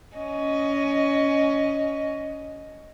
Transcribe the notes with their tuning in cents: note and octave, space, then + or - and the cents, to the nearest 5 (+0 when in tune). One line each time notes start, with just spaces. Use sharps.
C#4 +20 D#5 +0